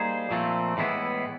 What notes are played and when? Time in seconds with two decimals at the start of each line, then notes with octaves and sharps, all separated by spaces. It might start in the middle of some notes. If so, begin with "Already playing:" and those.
Already playing: G3 A#3 D#4 G#4 C5
0.31 A#2 F3 A3 C4
0.77 A2 E3 G#3 B3 E4